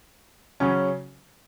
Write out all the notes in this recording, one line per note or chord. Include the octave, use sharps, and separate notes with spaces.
C#3 F#3 C#4